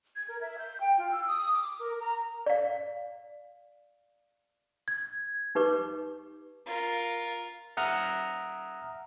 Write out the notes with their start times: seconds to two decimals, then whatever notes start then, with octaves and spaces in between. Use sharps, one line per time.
0.16 G#6
0.28 A#4
0.41 E5
0.58 G6
0.80 G5
0.98 F4
1.11 E6
1.28 D#6
1.53 D6
1.80 A#4
2.00 A#5
2.46 D5 F5
4.88 G#6
5.55 D#4 G4 B4 D6
6.66 F4 A#4
7.77 E5 F#5 A#5 D#6 F6 A#6